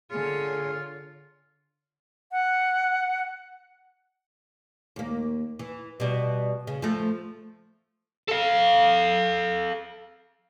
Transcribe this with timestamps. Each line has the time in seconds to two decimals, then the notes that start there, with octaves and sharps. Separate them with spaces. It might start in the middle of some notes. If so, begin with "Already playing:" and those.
0.11 D3 F4 G#4 C#5
2.32 F#5
4.96 D#2 A#3
5.59 E3
6.00 B2 G3
6.67 C#3
6.82 F3 A3
8.28 A4 F5